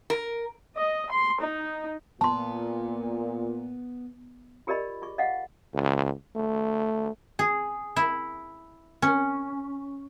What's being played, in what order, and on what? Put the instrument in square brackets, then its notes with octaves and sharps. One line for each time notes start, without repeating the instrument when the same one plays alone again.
[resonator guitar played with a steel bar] A#4
[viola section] D#5
C6
D#4
[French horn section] A#2 [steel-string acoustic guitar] B3 [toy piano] A5 C6
[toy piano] F4 G4 A#4 D5 D#5 B5
F4 G#4 C#6
D#5 F5 F#5
[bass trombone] C#2
A3
[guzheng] G#4
E4
C#4